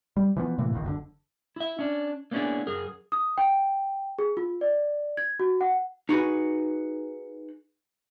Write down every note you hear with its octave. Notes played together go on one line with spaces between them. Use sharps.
G3
E3 F3 B3
A2 C3 E3 A#3
F#1 B1 F2 D#3
F#1 A#2 D3
E4 E5
C#4 D4
A#3 B3 C#4 D4 E4 G#4
F#2 G#4 A#4
D#6
G5
G#4
F4
D5
G#6
F#4
F#5
D#4 F#4 G#4 B4